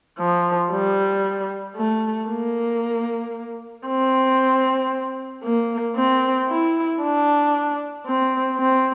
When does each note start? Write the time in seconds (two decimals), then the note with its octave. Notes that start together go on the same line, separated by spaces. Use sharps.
0.19 F3
0.71 G3
1.76 A3
2.29 A#3
3.86 C4
5.43 A#3
5.96 C4
6.48 E4
7.02 D4
8.06 C4
8.59 C4